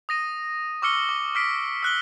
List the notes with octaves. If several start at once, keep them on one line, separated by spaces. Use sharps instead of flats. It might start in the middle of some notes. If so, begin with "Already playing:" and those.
D#6 A#6 D#7
C#6 D6 E6 F6 C#7 G7
D6
D6 F6 B6 C7 D7
E6 F#6 G7